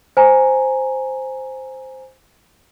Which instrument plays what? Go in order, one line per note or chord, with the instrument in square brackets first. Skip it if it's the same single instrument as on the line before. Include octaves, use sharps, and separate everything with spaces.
[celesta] C5 G#5 A#5